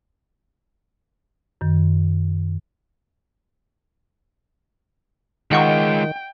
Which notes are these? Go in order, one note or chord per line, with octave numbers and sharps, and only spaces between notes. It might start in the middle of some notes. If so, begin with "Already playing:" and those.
F#2 D#3
D#3 G#3 F4 D#5 F#5 G5 C#6